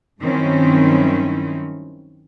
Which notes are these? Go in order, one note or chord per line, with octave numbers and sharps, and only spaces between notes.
G2 D#3 F#3 C4 C#4 E4